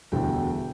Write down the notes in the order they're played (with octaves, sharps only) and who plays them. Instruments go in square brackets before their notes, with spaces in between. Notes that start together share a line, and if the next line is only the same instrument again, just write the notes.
[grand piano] E1 D2 D3 G3 E4 G5